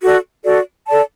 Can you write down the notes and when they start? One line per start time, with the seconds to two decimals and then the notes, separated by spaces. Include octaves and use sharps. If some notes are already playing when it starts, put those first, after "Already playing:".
0.01 F#4 A4 D5
0.44 F#4 A4 D5
0.86 A4 D5 A5